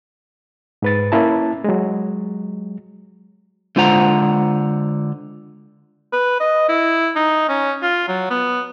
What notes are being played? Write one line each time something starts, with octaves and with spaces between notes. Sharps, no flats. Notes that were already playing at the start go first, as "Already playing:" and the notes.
G#2 B4 A6
A#3 C#4 E4 A5
F#3 G#3
D3 G#3 F4 C5 F#5 A#5
B4
D#5
E4
D#4
C#4
F4
F#3
B3